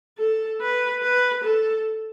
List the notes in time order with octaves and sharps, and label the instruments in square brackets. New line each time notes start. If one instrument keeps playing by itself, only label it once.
[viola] A4
B4
B4
A4